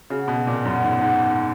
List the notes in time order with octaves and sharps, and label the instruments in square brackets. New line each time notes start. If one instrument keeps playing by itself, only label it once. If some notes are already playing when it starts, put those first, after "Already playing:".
[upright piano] C#3 [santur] F#4
[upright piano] B2
[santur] B3
[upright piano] A#2
[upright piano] F#2 [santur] B3
[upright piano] G#2
[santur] B3
[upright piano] G#2
[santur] B3